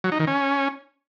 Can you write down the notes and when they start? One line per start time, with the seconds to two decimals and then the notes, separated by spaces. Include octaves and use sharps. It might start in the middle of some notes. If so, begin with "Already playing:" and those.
0.04 F#3
0.12 D#4
0.19 D#3
0.27 C#4